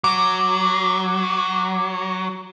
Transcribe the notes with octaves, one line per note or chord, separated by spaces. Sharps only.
F#3 D6